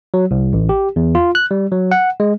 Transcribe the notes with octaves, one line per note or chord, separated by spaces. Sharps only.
F#3
C2
A1
G4
E2
F4
F#6
G3
F#3
F#5
G#3